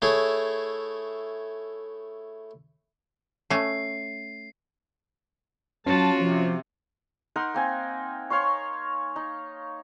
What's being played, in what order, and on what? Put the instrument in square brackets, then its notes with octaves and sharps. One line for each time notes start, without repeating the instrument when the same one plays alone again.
[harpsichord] A3 E4 G#4 C#5
[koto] A3 C#4 [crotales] C7
[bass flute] F#3 [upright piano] C#4 [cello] F4 F#4 [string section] A5
[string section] C3 [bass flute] F3
[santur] D#4 A#4 F#5 C6
A#3 C4 G#5
C#5 F5 C6 C#6
D#4